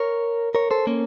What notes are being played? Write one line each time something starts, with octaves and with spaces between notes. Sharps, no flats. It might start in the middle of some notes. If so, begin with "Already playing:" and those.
Already playing: A#4 C#5
A#4 C#5
A4 C5
A#3 C#4